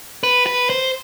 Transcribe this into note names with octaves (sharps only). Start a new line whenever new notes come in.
B4
B4
C5